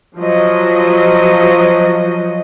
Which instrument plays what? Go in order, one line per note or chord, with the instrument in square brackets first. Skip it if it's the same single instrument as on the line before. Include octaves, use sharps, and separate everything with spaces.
[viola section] F3 F#3 D#5